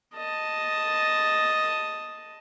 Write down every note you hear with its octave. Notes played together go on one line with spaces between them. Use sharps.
D#5 A5